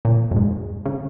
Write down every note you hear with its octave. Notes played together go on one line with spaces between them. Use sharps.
A#2
F#2
G#2
C#3